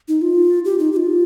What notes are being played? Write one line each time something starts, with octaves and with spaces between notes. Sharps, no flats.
D#4
F4
G4
D#4
G4
F4